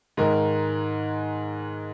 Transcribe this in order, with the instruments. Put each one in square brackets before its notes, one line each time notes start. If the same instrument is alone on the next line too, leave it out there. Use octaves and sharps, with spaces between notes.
[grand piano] G#2 D#3 G#3 A#4